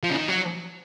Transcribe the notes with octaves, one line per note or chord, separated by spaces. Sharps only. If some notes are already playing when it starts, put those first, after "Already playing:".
F3
C#3
D#3
F#3